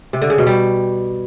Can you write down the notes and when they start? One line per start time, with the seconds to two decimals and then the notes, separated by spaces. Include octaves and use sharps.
0.13 C3
0.22 D3
0.30 C#3
0.38 B2
0.47 G3